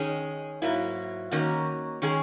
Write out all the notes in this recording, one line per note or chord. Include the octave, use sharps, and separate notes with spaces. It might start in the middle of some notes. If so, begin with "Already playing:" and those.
Already playing: D#3 G#3 C#4 G#4
G#2 F#3 A#3 E4
D#3 A#3 C#4 F#4
D#3 G#3 C#4 G#4